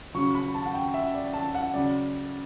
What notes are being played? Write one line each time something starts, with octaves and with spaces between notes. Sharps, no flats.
C#3 F#3 C#6
B5
A5
F#5
G5
E5
D5
A5
F#5
C#3 F#3 D5